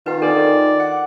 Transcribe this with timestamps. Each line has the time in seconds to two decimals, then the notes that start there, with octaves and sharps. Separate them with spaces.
0.06 D#3 F4 B4 F#5
0.22 D4 A4 A#4 D5
0.79 F#5